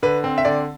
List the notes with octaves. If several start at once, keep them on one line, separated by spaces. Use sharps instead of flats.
D3 B4
C4
E5
D3 D5